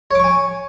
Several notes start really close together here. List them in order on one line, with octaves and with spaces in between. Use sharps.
C#5 D6 C#6 G#5